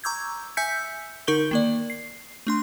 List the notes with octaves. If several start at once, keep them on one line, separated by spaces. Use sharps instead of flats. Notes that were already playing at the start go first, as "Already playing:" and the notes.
A#5 C#6 D6 E6 G6 G#6
E5 G#5 E6 G6 B6 C#7
D3 D#4 A#4 C#6 G6 G7
D#3 A#3 D5
C7
A3 D4 C6